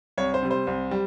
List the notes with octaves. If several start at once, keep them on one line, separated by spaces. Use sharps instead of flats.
C2 C#5
C5
C3 G3
C5
C2
G3